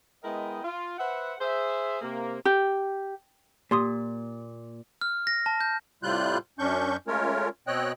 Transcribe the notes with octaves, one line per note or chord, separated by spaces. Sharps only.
G#3 B3 E4 A#4 D#5 G5
F4
B4 C5 E5 F#5
G#4 C5 E5
C3 A#3
G4
A#2 G4 C6 D#6
F6
A#6
A5
G6
A2 C3 G3 F4 F#6 G6
F#2 C#4 D4 C#6 G6
G#3 A3 C#4 F4 A#4 C#5
B2 C4 C#5 D#5 G5 F#6